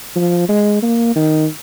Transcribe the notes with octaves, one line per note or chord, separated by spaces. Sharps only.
F3
G#3
A#3
D#3